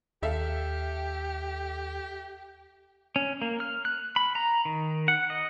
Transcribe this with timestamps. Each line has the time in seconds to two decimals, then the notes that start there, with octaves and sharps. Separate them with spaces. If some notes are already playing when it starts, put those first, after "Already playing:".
0.23 D#2 G4 A4 E5 F5
3.16 C#4
3.42 A#3
3.60 F6
3.85 F#6
4.16 B5
4.35 A#5
4.65 D#3
5.08 F#5
5.30 D#5